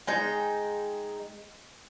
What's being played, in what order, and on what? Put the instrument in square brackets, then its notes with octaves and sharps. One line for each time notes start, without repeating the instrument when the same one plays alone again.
[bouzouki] G#3 D#4 G5